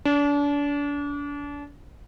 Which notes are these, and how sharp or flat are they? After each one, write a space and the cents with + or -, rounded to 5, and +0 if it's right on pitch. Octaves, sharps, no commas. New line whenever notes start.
D4 -35